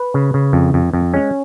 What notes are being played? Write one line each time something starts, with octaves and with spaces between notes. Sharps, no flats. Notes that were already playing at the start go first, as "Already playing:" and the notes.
Already playing: B4
C#3
C#3
F2
F2
F2
G#3 C#4